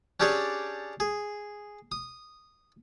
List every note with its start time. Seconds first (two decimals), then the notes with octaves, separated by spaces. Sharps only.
0.20 C#4 D4 G4 G#4 C#5 D5
1.00 G#4
1.92 D#6